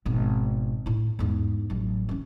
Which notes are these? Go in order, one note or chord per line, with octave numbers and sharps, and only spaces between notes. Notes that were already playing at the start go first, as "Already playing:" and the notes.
G#1 B2
A2 E4
E2 G#2
A1 F#3
E3 C#4